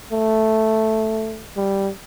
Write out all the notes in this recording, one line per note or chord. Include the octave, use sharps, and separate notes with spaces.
A3
G3